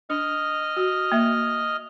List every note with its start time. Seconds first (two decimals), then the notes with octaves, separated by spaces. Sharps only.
0.10 D4 D#5 F6
0.77 F#4
1.12 A#3 E5